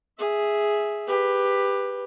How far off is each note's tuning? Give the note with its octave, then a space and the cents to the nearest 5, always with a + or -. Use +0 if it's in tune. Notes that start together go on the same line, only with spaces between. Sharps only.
G#4 +0 E5 +0
G4 +15 B4 +0